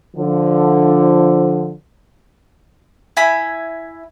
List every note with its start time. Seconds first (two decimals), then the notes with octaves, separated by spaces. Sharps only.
0.17 D3 F3
3.17 E4 G#5 B5